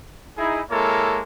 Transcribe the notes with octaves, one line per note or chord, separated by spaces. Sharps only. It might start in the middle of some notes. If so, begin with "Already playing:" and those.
D#4 E4 G#4
G#3 A#3 E4 A4 A#4 C#5